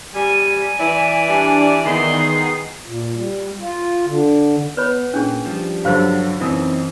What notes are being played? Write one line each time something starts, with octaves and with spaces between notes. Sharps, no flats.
G3 G#5
E3 E4 D5
G3 D4
D#3 B3 D#4 G#4 C6
A#2
G3
F4
D3
B3 B4 C#5 B5
A#2 C#4 D4 G#4
F3 G3
G2 D3 F#3 C5 F5
F#2 E3 C4 D#4 D#6